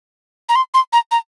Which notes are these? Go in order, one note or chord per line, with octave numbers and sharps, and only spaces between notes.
A#5
C6
C6
A#5
A#5